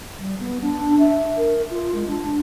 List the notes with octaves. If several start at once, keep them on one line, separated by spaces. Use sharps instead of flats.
G3
B3
D4
E5
A#4
F4
G#3
D4